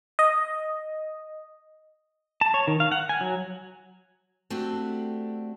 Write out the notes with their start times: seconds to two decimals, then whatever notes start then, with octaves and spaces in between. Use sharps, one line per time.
0.19 D#5
2.41 A5
2.54 C#5
2.67 D#3
2.80 F5
2.92 F#5
3.09 G#5
3.21 F#3
4.50 A3 C4 D4 F#4 G4